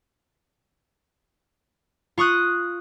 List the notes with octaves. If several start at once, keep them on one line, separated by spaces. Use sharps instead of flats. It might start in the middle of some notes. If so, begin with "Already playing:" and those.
F4 C#6 D#6 F#6